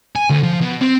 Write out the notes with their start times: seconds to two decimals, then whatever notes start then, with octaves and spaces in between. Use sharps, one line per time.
0.16 G#5
0.30 D2
0.43 F3
0.61 B2
0.81 C4